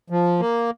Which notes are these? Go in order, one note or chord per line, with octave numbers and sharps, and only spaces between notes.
F3
A#3